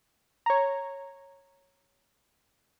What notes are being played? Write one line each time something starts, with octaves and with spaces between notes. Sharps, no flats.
C#5 A#5